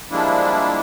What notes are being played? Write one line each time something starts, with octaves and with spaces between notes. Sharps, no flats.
F3 G3 G#3 A#3 D4 E4